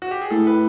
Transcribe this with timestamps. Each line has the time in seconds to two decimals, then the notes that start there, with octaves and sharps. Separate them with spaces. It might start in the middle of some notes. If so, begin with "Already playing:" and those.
0.02 F#4
0.11 G4
0.22 G#4
0.30 A2 A4
0.47 B4